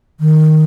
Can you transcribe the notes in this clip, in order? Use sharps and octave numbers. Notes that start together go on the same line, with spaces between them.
D#3